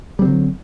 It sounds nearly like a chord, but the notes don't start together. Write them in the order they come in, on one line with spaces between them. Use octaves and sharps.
G3 C4 D3 F#3